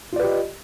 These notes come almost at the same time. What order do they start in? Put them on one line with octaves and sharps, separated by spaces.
F4 D5 B4 G4 D#5